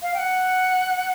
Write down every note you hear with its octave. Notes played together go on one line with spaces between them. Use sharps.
F5
G5
F#5